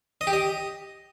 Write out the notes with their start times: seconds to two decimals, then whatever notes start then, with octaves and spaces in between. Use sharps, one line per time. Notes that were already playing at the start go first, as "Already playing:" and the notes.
0.21 D#5
0.27 G4
0.33 D#5